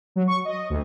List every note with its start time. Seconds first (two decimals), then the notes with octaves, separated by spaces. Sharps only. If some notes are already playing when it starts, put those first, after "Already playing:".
0.16 F#3
0.27 C#6
0.45 D#5
0.70 D2